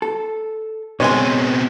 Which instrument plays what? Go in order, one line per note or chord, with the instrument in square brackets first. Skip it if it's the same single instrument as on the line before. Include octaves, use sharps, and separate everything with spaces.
[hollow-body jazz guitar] A4
[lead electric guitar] B2 C4 [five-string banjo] D#3 G#3 G#5 [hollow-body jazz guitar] B4 C#5